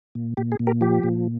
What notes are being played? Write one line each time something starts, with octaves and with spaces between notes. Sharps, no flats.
A#2
A#2 G4
G#4
A#2
G4 A#4
F3 G4
A#2